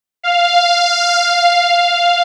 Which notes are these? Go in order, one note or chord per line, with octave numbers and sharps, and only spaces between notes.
F5